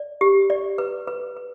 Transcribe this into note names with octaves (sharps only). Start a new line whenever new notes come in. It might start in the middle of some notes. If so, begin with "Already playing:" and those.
Already playing: D5
G4
D5
B4
B4
B4